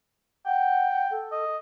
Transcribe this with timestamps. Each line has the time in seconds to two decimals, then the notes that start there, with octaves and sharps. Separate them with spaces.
0.46 F#5 G5
1.11 A4
1.32 D#5